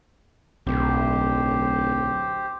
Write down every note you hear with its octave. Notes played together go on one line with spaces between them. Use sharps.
D1 B1 G4 C5